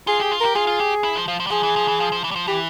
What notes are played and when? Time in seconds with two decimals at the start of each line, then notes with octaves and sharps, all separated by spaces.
0.07 F4 G#4
0.20 G4 G#4
0.31 F4
0.40 G4 A#4
0.55 F4 G#4
0.67 F4
0.80 G4
1.04 E4
1.16 F3
1.28 F3
1.40 F3
1.47 G3
1.51 F3 G#4
1.63 E3
1.76 F3
1.88 E3
2.00 F3
2.12 F3
2.24 E3
2.31 G3
2.36 F3
2.48 E3 G4